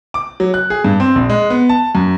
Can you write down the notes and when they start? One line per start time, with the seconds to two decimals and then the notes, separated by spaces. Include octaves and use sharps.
0.14 D6
0.40 F#3
0.54 F#6
0.70 G#4
0.84 G2
1.00 C4
1.16 A#1
1.30 G#3
1.50 B3
1.69 A5
1.95 F#2